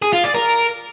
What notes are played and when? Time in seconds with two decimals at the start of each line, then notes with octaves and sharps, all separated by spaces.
0.02 G#4
0.13 F4
0.24 D5
0.34 A#4